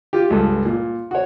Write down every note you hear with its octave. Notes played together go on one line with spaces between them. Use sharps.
F4 G4
C#2 G2 A4
A#2
F#4 C#5